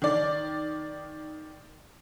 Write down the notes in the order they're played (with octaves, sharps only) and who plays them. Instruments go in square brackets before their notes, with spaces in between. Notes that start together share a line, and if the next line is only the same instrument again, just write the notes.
[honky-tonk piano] D#3 D5